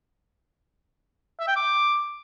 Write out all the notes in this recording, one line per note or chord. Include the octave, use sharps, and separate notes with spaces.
E5
G5
D6